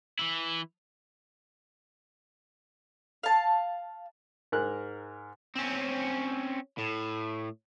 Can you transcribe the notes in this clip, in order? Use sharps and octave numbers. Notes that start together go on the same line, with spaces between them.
E3 E4
F5 A5
G#2 A#4 F#6
C4 C#4
A2